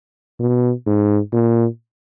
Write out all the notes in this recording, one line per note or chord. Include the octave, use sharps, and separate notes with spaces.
B2
G#2
A#2